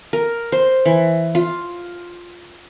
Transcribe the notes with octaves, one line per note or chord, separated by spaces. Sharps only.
A#4
C5
E3
F4